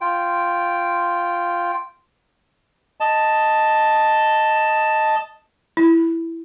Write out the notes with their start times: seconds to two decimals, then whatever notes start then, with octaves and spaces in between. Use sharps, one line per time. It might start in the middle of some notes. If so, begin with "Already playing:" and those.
0.01 F4 G5
3.00 D#5 A5
5.77 E4